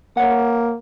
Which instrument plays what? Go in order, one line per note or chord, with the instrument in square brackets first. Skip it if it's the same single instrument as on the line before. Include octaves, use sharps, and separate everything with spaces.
[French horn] A#3 [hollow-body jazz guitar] C#5 F#5